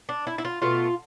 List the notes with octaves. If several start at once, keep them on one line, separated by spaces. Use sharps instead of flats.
D4
E4
E4
F4
B2 A3 F4